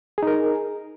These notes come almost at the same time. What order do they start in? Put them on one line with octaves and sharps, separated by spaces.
G#4 D#4 A#4